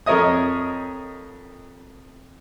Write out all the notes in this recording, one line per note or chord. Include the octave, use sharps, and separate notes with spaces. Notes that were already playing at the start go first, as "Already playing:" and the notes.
F2 A#4 C#5 D#5 D#6